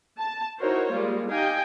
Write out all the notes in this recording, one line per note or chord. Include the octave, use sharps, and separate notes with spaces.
A5
D#4 E4 F#4 A#4 C5 C#5
G3 G#3 A#3 F4
D#4 G4 D#5 F5 G5 G#5